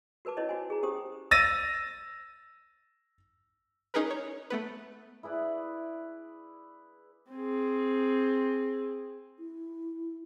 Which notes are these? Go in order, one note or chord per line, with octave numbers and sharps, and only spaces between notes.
F#4 A#4 B4 A5 D6
C#4 D#4 E4 B4 C#5 D#5
D#4 F#4 C5 G#5
G#4 A#5
C#4 G4 C5 D#6
E6 A6 A#6 D#7
C#4 D#4 G#4 A#4 B4
C#5
A3 B3 B4
E4 G#4 B4 D5
C4 G#4
E4